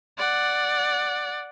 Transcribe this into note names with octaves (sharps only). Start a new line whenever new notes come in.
D5 F#5